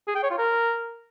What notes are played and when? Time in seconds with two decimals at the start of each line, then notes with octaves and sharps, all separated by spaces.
0.07 G#4
0.15 G5
0.23 C#5
0.30 F4
0.38 A#4